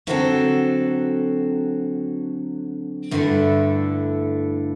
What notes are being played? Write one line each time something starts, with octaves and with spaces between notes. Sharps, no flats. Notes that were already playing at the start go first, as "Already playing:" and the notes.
D3 F#3 C4 F#4 A4
G2 D3 A3 E4 A4